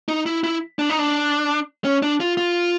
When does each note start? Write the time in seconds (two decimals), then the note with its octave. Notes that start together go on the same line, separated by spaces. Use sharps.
0.09 D#4
0.26 E4
0.44 E4
0.79 D4
0.89 D#4
0.99 D4
1.85 C#4
2.02 D4
2.20 F4
2.37 F4